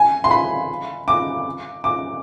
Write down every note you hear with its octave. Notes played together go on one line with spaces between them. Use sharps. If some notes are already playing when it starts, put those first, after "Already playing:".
Already playing: G#5
C6
B5
D6
D6